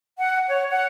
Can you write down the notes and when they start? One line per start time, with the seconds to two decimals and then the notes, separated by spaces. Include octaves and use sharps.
0.19 F#5
0.48 C#5
0.70 F#5